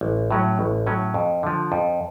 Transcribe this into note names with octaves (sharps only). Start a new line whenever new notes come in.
A1
A2 F#3 C#4
A1
A2 F#3 C#4
F2
D3 F3
F2